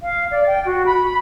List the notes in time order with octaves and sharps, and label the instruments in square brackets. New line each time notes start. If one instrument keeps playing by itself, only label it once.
[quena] F5
D5
G5
F#4
B5